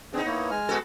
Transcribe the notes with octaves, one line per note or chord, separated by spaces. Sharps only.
B3 C4 D4 D#4 G#4
A#3 E4 C#5
G#3 G#5 F6
B3 F#4 A4